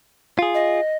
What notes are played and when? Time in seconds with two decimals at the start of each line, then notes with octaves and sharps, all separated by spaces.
0.39 F4 G#4
0.54 D#5